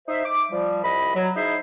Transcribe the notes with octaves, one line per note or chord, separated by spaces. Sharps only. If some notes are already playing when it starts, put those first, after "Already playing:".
D#4 C5 E5
D6
F3 G3
C2 D#5 B5
F#3
D#4 E4 G#4 C5 E5